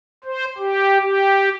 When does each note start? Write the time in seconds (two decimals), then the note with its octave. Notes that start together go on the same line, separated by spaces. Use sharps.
0.24 C5
0.58 G4
1.00 G4